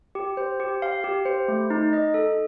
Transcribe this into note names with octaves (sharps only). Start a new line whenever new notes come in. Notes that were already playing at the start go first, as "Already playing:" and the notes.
G4
C5
G4
F5
G4
C5
A3
D#4
D#5
A4